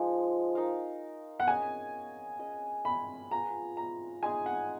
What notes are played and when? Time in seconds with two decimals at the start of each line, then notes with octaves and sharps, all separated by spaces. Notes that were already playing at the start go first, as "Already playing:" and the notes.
Already playing: F3 G#3 D#4
0.55 D#4 A#4 F5
1.40 F#5
1.47 C#4 G#4 D#5 G#5
2.39 C#4 G#4 D#5
2.85 B5
3.31 B3 F4 G#4 A#5
3.77 A#5
4.23 G#3 D#4 G#4 G#5
4.46 F#5